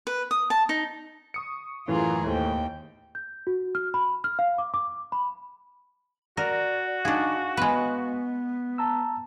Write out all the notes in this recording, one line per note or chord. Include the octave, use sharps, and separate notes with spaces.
B4
D#6
A5
D#4
C#6 D#6 C#7
F#2 A2 E3 F4 G#4 A#4
D#2 A2 A3 C5 G5
G6
F#4
F6
B5
F6
F5
D6
D6
B5
F#4 A#4 D5
D4 D#4 G#4 F5 C#6
G#3 B3 B4
A5 A#5 E6